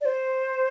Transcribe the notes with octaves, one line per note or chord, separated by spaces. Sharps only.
D5
C5